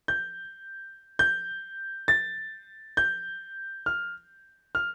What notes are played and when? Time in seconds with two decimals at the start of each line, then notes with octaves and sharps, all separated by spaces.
0.08 G6
1.19 G6
2.08 A6
2.97 G6
3.86 F6
4.75 F6